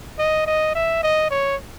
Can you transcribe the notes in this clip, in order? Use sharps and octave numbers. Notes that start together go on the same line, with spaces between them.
D#5
D#5
E5
D#5
C#5